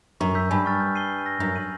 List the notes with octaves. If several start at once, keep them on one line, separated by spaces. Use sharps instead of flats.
F#2 C#6
E6 G6 B6
G2 G#5
C#6 F6 A6
G6
C7 D#7 G7
C#6
E6 G6 A#6 D#7
F#2 G6
A#6 D#7 F#7